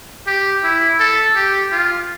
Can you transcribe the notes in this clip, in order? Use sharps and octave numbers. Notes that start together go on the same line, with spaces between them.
G4
E4
A4
G4
F4